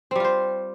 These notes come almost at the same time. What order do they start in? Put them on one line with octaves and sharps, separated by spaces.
C4 G3 F4 C5